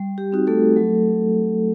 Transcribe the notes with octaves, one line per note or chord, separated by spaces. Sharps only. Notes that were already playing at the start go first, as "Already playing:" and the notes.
Already playing: G3
G4
C4 D#4 F#4
A3 A4
F#3